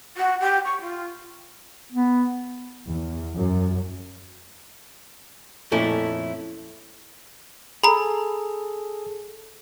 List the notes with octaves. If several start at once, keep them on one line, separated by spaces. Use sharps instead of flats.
F#4
G4
C#6
F4
B3
E2
F#2
F2 A#2 A3 C#4 E4
G#4 A4 A#5 B5